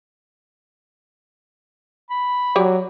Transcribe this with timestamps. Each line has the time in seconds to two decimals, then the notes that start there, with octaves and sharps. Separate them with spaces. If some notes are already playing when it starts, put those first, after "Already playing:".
2.10 B5
2.56 F#3 G4 C#5 D5